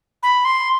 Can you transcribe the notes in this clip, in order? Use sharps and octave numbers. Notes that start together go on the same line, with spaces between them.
B5
C6